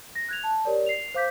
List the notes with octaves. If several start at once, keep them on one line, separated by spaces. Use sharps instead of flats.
A#6
F#6 G#6 F7
A5
G4 A#4 C#5 D5
C7 F7
C5 F5 D6 G6 B6